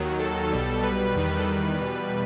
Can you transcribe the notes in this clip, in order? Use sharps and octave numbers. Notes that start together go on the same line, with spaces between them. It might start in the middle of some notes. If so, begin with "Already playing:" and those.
Already playing: D#2 D#3 F#3
A4
B1 B2 G3
B4
E2 D#3 G3
A4
B4
E2 B2 G3